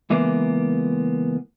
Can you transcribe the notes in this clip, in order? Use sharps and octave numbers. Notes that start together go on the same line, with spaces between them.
C#2 E3 G#3 A#3 B3